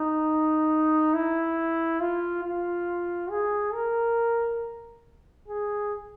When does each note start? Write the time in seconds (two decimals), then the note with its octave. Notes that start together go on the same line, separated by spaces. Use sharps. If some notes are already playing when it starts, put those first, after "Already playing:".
Already playing: D#4
1.14 E4
2.00 F4
2.43 F4
3.30 G#4
3.73 A#4
5.48 G#4